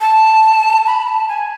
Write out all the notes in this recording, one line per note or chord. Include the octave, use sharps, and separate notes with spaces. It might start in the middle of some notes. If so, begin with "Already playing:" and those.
A5
B5
A5
G#5